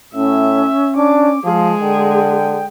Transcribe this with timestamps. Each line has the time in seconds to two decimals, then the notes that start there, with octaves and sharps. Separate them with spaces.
0.15 A2 C#4 E5
0.97 D4 D6
1.45 F3 G#3 G#4 F5
1.81 D3 G5